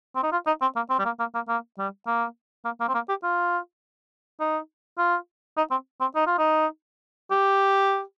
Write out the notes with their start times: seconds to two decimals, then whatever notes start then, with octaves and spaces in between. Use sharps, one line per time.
0.16 C4
0.23 D#4
0.32 F4
0.47 D#4
0.62 C4
0.76 A#3
0.90 C4
0.99 G3
1.05 A#3
1.20 A#3
1.35 A#3
1.48 A#3
1.79 G3
2.07 A#3
2.65 A#3
2.81 A#3
2.89 C4
2.94 A#3
3.09 G4
3.23 F4
4.40 D#4
4.98 F4
5.57 D#4
5.71 C4
6.01 C4
6.16 D#4
6.27 F4
6.39 D#4
7.31 G4